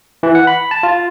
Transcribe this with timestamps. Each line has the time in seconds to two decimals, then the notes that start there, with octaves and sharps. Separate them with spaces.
0.23 E3
0.35 F#5
0.47 B5
0.71 A5
0.83 F4